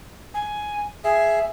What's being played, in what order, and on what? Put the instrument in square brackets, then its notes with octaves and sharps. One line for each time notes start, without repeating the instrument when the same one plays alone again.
[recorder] G#5
[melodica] G#4 [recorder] E5